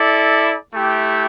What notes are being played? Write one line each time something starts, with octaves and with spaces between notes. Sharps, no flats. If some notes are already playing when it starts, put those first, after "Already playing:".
Already playing: E4 A4 D5
A3 E4 G4